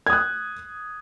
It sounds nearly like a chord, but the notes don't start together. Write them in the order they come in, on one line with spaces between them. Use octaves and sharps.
G#6 D#6 F#6